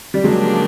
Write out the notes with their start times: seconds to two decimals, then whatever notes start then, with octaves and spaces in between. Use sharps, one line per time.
0.14 G3
0.24 C#3 F3 F#3 G#3 A#3 D4 G4